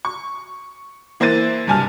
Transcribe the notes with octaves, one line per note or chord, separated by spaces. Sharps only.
C#6
E3 A#3 E4 C5 A6 D#7
F#1 G2 C3 G#5 A5 F6